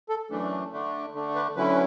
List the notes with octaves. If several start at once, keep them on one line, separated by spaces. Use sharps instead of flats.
A4
F#2 E3 A3 D4
D3 A3 D4
D3 A3 D4
B4
D2 D3 F#3 C#4 E4 B4